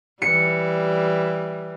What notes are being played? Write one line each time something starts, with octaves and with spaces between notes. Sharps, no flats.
E3 G3 C#7